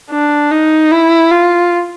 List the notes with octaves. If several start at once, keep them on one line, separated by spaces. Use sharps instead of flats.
D4
D#4
E4
F4